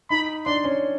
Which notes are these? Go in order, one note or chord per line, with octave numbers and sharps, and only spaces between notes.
D#4 B5
D4 C6
C#4